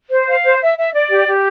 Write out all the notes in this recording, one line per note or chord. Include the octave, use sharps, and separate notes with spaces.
C5
F5
C5
E5
E5
D5
G4
G4